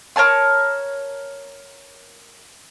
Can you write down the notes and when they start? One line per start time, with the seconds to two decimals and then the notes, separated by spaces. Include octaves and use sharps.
0.16 A#4 C#5 A5 C6